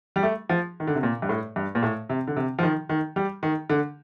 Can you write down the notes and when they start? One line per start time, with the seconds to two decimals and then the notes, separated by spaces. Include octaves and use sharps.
0.16 G3
0.23 A3
0.49 F3
0.80 D#3
0.87 D3
0.95 C3
1.03 A#2
1.22 G2
1.29 A2
1.56 G2
1.75 A#2
1.83 A2
2.09 C3
2.28 D3
2.36 C3
2.59 F3
2.63 D#3
2.89 D#3
3.16 G3
3.43 D#3
3.70 D3